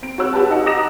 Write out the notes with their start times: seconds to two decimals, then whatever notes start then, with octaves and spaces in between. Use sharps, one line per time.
0.02 C4 D7
0.18 F#4 C#5 E6 F#6
0.33 F#4 G4 B4 A5
0.50 D#4 D#5 F#5
0.66 A#5 D6 D#6 F#6 A#6 E7